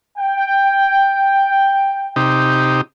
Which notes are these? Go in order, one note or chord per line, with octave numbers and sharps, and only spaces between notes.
G5
C3 D#4 G4